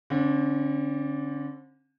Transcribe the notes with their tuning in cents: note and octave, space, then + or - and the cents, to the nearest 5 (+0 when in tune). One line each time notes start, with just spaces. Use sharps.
D3 -20 C4 +40